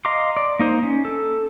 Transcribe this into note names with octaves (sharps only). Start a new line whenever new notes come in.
D#5 F5 A#5 C6 D6
D5
A#3 D#4 C5
C#4
A4